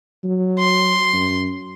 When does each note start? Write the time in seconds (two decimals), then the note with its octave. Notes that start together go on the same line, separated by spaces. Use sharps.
0.23 F#3
0.59 C6
1.13 F#2